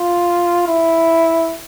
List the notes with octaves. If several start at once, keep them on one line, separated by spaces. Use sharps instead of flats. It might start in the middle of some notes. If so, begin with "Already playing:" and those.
Already playing: F4
E4